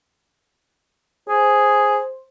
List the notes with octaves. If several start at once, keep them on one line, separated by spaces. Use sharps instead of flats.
G#4 C5